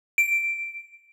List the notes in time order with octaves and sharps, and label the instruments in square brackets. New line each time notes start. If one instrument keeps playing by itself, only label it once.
[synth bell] D7